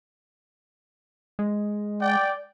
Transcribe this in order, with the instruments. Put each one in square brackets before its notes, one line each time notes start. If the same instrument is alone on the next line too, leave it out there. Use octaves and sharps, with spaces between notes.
[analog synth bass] G#3
[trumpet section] D5 [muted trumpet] G5